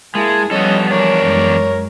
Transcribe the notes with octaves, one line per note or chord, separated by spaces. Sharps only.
G#3 A#3 E4 G#4 A5
F3 G3 B3 C#4 A4 D#5
E2 D4 A#4 C#5
F#2 G#3